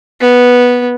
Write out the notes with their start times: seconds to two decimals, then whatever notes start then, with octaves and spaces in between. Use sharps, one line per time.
0.21 B3